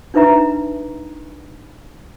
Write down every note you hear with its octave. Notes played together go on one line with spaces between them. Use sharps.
D4 D#4 B4 E5 A#5